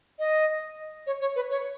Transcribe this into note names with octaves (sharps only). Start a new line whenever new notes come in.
D#5
C#5
C#5
B4
C#5